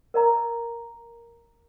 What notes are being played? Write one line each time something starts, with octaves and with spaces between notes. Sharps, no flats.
A#4 D#5 A#5